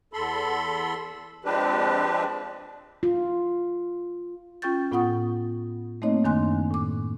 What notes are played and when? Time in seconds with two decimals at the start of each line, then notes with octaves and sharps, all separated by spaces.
0.13 E2 A4 B5 C6
1.45 F3 G#3 C4 D4 G4 B4
3.03 F4
4.62 C#4 F4 G5 C#6 G6 A6
4.92 A2 B3 F4 F#5 C#6 D#6
6.02 A3 A#3 C4 D#4 C#5 D#5
6.24 F#2 D#3 D4 G#5 C6 F#6
6.71 A2 D6